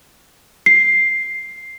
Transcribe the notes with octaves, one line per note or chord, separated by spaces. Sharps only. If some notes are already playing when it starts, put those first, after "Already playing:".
C7